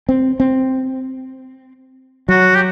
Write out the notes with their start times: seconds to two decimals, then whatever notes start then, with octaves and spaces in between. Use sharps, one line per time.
0.09 C4
0.40 C4
2.29 F#3 F#4
2.55 G4